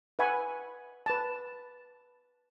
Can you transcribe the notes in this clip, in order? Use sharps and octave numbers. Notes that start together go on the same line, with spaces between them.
B4 E5 F#5 G#5 B5 C#6
B4 A5